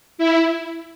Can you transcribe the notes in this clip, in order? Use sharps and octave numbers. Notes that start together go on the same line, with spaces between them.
E4